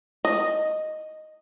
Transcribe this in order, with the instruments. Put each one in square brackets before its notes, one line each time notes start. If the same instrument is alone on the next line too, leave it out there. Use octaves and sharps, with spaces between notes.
[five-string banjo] D#5